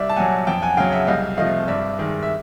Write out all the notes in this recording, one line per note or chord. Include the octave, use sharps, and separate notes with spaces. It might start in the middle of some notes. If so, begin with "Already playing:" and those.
Already playing: C2 D5 E5
A5
A#2 F#3 F#5 G#5
F2 G5 A5
F#5 G#5
C#3 F#3 F5 G5
E5 F#5
C2 D#5 F5
C3 F3 A3 D#5 F5
G2 D5 E5
D#3 G#3
E5